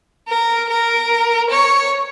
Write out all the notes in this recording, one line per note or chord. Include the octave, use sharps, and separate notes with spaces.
A#4
A#4
C#5